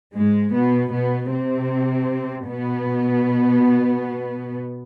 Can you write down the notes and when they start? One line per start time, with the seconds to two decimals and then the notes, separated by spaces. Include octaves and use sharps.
0.15 G#2 G#3
0.54 B2 B3
0.92 B2 B3
1.31 C3 C4
2.47 B2 B3